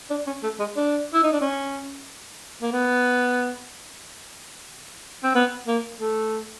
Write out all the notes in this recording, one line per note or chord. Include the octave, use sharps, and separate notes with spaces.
D4
C#4
A3
G#3
D4
E4
D#4
D4
C#4
A#3
B3
C4
B3
A#3
A3